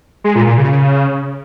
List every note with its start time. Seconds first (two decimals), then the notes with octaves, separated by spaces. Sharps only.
0.24 G#3
0.35 A#2
0.47 A#2
0.58 C#3